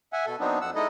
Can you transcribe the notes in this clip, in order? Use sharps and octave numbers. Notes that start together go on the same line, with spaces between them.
E5 F#5 G#5
B2 A4
F#3 B3 C4 D4 D#4
F2 F#5 E6
G#3 D#4 E4 A4 D#5